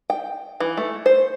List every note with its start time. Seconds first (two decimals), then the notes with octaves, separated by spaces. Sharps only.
0.10 G5
0.60 E3
0.77 A3
1.06 C5